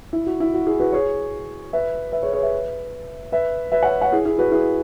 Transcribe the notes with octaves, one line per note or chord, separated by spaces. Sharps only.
E4
F#4
E4
F#4
E4 G#4
F#4 B4
G#4 C#5
B4 E5
B4 E5
G#4 C#5
G#4 C#5
B4 E5
B4 E5
B4 E5
C#5 F#5
C#5 F#5
E4 G#4
E4 G#4
F#4 B4
E4 G#4